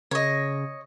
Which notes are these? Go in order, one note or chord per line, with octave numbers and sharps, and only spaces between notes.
C#3 C#5 D#5